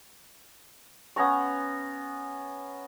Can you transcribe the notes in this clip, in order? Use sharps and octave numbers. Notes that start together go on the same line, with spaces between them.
B3 C#4 A#5 C#6